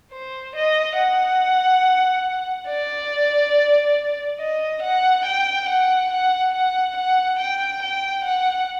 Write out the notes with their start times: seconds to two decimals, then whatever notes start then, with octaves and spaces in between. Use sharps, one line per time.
0.12 C5
0.56 D#5
0.98 F#5
2.69 D5
4.39 D#5
4.82 F#5
5.25 G5
5.68 F#5
6.11 F#5
6.54 F#5
6.96 F#5
7.39 G5
7.82 G5
8.24 F#5